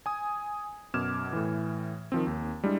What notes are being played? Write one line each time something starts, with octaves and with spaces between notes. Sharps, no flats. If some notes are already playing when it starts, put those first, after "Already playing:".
G#5 D#6
F#2 B2 D6 F6 G#6 E7
A2 E3
D#3 F3 C4
D#2
G3 G#3 D4 E4